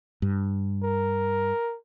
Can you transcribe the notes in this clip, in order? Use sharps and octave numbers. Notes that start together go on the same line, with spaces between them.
G2
A#4